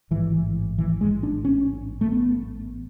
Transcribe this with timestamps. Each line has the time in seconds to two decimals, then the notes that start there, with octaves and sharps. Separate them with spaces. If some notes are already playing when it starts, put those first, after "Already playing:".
0.11 A1 G#2 E3
0.78 E3
1.01 G#3
1.23 D4
1.45 C#4
2.01 A3
2.12 B3